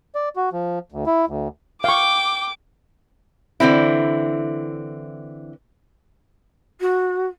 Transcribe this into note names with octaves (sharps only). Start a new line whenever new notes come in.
D5
F#4
F3
D2
E4
D2
F5 G5 C#6 D6
D3 E3 C4 E4
F#4